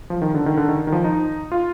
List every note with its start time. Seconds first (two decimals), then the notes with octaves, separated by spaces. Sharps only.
0.10 F3
0.22 D#3
0.34 D3
0.46 D#3
0.57 D3
0.69 D#3
0.87 D#3
0.92 F3
1.04 D#4
1.52 F4